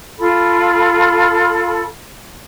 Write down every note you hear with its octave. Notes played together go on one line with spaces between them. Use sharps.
F4 A4 B5